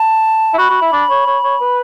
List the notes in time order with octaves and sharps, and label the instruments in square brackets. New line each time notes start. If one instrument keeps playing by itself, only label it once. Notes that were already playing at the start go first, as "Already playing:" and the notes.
Already playing: [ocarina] A5
[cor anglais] E4
[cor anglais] F#4 [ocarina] B5
[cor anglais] F#4
E4
D4
C#5
C#5
C#5
B4